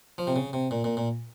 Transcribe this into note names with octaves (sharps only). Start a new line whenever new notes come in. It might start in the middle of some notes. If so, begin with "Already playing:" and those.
F3
C3
C#3
C3
A#2
A#2
A#2